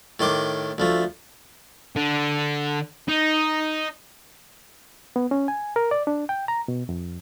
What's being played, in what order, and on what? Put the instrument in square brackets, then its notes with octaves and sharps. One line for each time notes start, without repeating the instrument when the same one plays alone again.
[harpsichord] A2 D#3 C6 D6
D2 F3 A3
[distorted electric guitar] D3
D#4
[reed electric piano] B3
C#4
G#5
A#4
D5
D4
G5
A#5
B2
F2